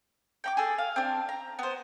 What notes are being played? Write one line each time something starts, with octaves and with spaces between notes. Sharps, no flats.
G5 A#5 D6
G#4 A4
F5
C4 D4
A#5
B3 C5